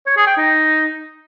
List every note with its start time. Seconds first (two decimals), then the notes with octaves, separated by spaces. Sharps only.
0.06 C#5
0.17 G#4
0.27 G5
0.37 D#4